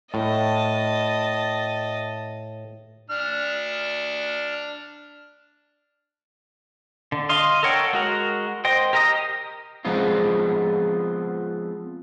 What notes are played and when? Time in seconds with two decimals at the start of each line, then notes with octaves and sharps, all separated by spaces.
0.14 A2 D#5 A5
3.10 D4 F6
7.12 D3
7.29 D#5 F5 C6
7.63 A4 A#4 C#5 F#5 G5
7.93 G#3 F#4 A#4
8.65 C5 D#5 G5
8.93 G4 A#4 D#5 A#5 D#6
9.85 F3 G#3 B3 C4 F4